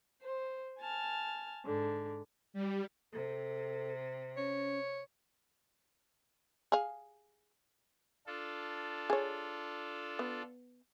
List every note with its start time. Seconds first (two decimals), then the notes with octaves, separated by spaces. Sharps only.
0.22 C5
0.80 G#5 A5 F6
1.66 G#2 D3
2.54 G3
3.13 C3 A4
4.37 C#4 C#5
6.72 G#4 F5
8.27 D4 F4 A4
9.10 G#4 C#5
10.19 B3